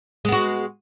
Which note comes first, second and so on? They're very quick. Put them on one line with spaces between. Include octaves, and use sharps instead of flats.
G#3 B3 F#4